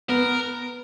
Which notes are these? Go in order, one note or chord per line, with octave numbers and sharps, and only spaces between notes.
B3 A#4